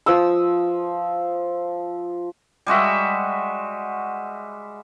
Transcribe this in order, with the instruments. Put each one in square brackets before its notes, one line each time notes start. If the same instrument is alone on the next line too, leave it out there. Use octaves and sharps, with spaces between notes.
[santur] F3 D#6 E6
[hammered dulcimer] G3 G#3 F#4 E5